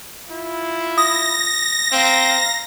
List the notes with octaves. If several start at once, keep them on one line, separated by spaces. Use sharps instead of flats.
E4 F4
D#6 A#6
C4 F5 A#5